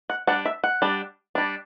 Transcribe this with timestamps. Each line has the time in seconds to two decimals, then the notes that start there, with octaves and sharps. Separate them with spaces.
0.10 F#5
0.27 G3 D4 F#5
0.45 E5
0.64 F#5
0.82 G3 D4
1.35 G3 D4